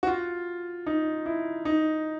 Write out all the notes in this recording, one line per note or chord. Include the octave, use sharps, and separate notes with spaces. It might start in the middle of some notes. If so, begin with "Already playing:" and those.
F#4
F4
D#4
E4
D#4